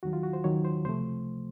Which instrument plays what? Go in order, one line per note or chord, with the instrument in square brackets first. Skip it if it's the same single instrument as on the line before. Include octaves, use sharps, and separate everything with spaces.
[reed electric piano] D#2 D#3 F#3 F#4
F4
F#4
C5
D#2 D#3 F#3 C#5
C5
C#2 C3 F3 A3 C5